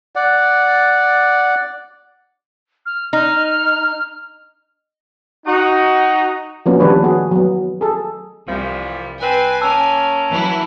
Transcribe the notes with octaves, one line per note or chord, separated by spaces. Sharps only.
D5 F#5
F6
D#4 F6
D#4 F#4
F3 A#3 B3 C#4 D4 F#4
D#3 G3 D4 B4 C#5
B3 F#4 G#4
F#3 B3
G#4 A4
C2 E3 F3 G3
C4 B4 G#5
A#3 C#4 A5 E6
E3 F#3 E4